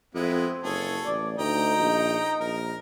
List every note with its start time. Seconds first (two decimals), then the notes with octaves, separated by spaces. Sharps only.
0.15 F2 G#3 B3 C4 E4
0.63 F#1 G#4 A4 C#5
1.06 A1 D5
1.39 D2 D#4 D#5 G5 A#5
1.78 A#1
2.40 A#1 A#4 A#5